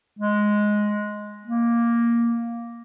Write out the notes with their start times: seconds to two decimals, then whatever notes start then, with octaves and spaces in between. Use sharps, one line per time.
0.19 G#3
1.45 A#3